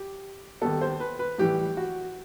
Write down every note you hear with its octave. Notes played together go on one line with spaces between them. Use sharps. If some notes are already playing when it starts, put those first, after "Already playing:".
Already playing: G4
D#2 D#3 G3 B3 A4
C5
B4
B4
A2 E3 G3 G4
F#4